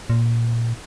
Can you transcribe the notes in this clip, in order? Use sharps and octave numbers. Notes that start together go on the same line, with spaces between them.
A#2